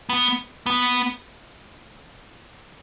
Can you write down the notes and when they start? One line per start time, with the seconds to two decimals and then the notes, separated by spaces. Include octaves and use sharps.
0.09 B3
0.66 B3